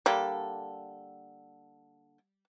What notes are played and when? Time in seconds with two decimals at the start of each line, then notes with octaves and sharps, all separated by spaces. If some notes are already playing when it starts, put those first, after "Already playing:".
0.06 D3 G3 A#3 A4